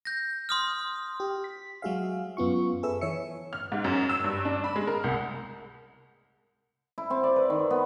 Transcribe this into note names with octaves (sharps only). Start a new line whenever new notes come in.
G6 A#6
C6 D#6 F6
G4
B6
F#3 G#3 F#4 G#4 E5 F5
F#2 B3 F4 C#6
G#4 A4 B4 E5 E6
E3 C#5 E5 C#7
F6
G#2
F#2
E6
G2
D4
B5
G#3
A#4
C2
E4
C4
D5
B4
D#3
B3